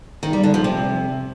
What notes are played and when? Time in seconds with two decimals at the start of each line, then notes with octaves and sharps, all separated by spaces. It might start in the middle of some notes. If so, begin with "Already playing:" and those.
0.23 D#3
0.33 G3
0.43 D3
0.54 F3
0.64 C3